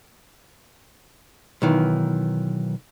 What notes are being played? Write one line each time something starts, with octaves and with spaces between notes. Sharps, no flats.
B1 D#3 E3